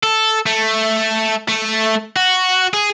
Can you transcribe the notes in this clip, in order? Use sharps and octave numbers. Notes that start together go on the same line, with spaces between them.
A4
A3
A3
F#4
G#4